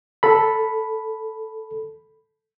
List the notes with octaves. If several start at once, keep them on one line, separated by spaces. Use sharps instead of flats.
A4 B5